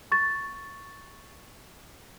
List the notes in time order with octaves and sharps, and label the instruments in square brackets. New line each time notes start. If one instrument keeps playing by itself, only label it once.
[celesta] C#6 A6